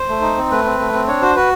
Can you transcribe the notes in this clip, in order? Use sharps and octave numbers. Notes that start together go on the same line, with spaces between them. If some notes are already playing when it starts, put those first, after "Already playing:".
Already playing: C5
A3
D#4
C4
A3 B4
C4
A3
C4
D4 C#5
F#4 C5
F#4 B4